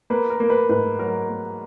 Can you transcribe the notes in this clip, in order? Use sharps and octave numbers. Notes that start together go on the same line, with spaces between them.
A#3 B4
A#4
A#3
B4
G#2 B4
F#3 A#4
A#3